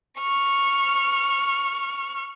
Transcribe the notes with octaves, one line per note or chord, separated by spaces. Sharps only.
C#6 F6